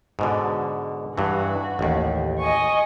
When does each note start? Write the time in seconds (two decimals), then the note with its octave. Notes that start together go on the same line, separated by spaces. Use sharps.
0.19 G#2 B2 D3
1.18 G2 E3 F#4
1.79 A1 D#2
2.40 D#5 G#5 C#6